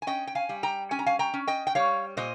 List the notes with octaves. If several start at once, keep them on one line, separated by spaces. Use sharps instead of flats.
G#5
C#4 D#5 G5
G5
F5 G#5
G3
G5 A#5
C#4 G#5
A#5
F5 G#5
G5 A#5
C#4
D#5 G5
G5
G3 C#5 F5
A#2 C5 D#5